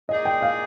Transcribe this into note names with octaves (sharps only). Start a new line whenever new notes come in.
A#2 G#3 D#4 G#4 D5 D#5
G5
F5